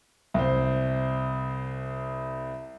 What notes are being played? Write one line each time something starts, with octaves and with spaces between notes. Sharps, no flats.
C2 C5